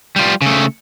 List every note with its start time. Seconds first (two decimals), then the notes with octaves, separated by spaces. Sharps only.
0.16 G3 F4
0.42 C#3 A3